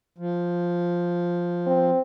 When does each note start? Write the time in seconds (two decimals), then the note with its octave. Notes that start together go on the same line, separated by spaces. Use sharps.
0.18 F3
1.67 C4